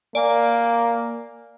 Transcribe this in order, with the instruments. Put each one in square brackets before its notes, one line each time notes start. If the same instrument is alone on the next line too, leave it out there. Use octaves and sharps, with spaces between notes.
[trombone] A#3 [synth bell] D5 G#5